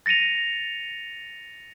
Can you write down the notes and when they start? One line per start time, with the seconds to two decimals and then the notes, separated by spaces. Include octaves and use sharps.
0.06 A6 A#6 C#7 D#7 F7